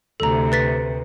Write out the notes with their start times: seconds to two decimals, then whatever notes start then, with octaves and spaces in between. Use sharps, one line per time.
0.20 D2 C3 A4 A#5
0.52 B4 A6 B6